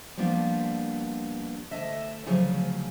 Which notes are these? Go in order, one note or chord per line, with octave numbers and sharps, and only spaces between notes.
F3 G3 A#3 B3 D4 F4
D2 A4 D#5 E5
D2 C#3 F3 F#3 G#4